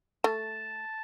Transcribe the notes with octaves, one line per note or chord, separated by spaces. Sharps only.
A3 A5